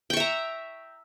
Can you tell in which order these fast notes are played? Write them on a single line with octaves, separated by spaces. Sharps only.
G5 C#6 E5 A#5